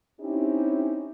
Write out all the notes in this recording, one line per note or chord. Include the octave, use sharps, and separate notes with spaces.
C4 C#4 D#4 E4 G4